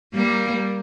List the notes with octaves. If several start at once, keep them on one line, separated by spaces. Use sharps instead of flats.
G3 A#3